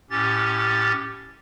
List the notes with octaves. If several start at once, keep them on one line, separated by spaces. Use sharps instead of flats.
A2 C#4 G4 A6